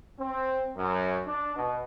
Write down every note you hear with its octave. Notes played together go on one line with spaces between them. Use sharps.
C4
F#2
D4
B2